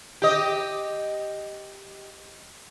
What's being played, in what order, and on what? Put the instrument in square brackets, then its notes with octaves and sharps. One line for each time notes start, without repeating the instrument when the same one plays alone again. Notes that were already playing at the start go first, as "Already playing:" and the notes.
[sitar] G4 D#5